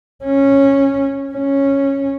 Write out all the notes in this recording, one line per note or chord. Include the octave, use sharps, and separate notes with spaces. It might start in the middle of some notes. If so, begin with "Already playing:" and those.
C#4
C#4